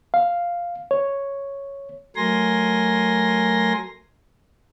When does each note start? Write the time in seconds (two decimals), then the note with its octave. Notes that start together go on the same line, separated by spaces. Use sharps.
0.14 F5
0.91 C#5
2.16 F#3 A3 A#4 G#5 C6 A#6